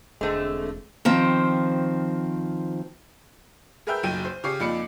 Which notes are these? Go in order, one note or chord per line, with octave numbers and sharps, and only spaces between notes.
E1 D3 G#3 A3 C4
D#3 F3 C4
G#4 A#4 B4 E5 G5 G6
F#1 B1 F#3 G5 G6 D#7
C5
C#3 G4 C#5 D6 C7
F2 A#2 D#4 D5 B5 C#7